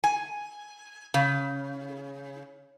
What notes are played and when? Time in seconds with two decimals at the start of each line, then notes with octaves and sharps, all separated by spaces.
0.04 G#5
1.14 C#3